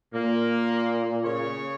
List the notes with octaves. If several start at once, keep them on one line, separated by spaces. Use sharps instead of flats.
A#2 A#3
C#3 C#5